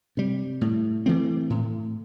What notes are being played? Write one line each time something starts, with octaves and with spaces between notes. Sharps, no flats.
C3 G3
A2
E3 A3 C4
A2